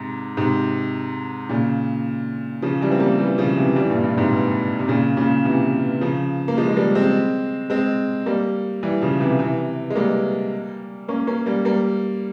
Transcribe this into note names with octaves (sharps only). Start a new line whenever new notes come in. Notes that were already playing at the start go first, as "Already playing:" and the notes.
Already playing: G#2 C3
G#2 C3
A#2 C#3
C#3 F3
E3 G3
C4
G3 A#3
E3 G3
C#3 F3
C3 E3
E3 G3
G2 A#2
G2 A#2
G#2 C3
C3
A#2 C#3
A#2 C#3
C3 E3
C#3 F3
A#3
F3 G#3
G#3
G3 A#3
G#3 C4
G#3 C4
G3 A#3
E3 G3
C#3 F3
C3 E3
C3 E3
G#3
G3 A#3
A#3 C#4
A#3 C#4
G3 A#3
G3 A#3